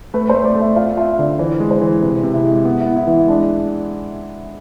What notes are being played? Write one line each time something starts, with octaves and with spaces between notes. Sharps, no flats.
A3 B4
A3 C5
D5
A3 E5
F4 F5
F4 E5
D3 D5
E3 C5
G#3
C5
E3
C3 B4
C3
E4
G#3
B3
E4
B3
E4
E3
G#3 D4